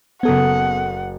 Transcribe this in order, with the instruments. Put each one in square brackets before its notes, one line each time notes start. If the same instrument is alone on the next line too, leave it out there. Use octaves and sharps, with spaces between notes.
[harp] F#1 D#6 G#6 [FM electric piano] B3 A4 [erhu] F#5